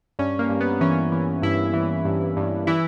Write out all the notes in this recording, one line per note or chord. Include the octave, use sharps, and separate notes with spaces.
G2 C#4
A#3
G2
B3
E3 C#4
E3
G2 E4
E3
G2
G2
E3 E4